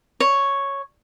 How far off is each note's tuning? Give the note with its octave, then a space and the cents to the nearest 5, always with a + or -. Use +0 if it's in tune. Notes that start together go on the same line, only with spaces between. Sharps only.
C#5 +0